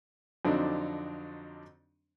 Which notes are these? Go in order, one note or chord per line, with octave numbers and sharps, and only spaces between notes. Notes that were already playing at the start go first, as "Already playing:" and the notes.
F2 D3 F#3 C4 D4 D#4